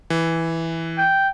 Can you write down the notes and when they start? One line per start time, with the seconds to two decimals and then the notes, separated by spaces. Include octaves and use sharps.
0.10 E3
0.98 G5